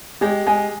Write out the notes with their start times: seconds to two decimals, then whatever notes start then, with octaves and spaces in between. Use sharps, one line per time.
0.21 G#3 G4
0.46 G#3 G#5